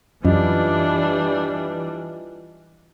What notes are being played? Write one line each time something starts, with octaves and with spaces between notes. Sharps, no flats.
F#2 E3 G3 D4 F4 D#5